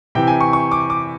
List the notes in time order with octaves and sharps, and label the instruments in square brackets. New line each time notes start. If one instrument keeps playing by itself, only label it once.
[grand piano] C3 E3 G5
G#5
C#6
C#6
D6
D6